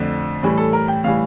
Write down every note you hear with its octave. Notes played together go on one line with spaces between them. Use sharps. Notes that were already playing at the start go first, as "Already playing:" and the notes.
Already playing: F2 D3 A3
A2 E3 G3
A4
A#4
G5
A2 E3 G3 F5